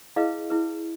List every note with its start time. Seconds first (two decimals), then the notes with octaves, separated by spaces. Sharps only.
0.16 E4 G#4 B4 D#5 F5
0.50 E4 G#4 B4